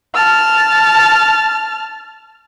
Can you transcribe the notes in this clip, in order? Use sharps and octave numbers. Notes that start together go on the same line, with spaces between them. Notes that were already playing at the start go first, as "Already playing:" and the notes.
A5 F6